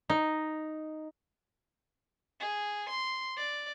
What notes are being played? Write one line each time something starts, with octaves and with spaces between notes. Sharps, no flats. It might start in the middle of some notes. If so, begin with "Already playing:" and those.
D#4
G#4
C6
D5